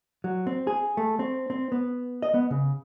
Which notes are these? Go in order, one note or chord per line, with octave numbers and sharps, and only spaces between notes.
F#3
C4
G#4
A3
C4
C4
B3
D#5
B3
C#3